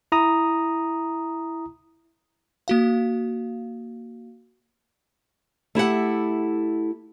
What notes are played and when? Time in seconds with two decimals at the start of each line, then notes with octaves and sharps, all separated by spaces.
0.12 E4 A#5 D#6
2.68 A#3 F#4 F5
5.75 A3 E4 G4 F#5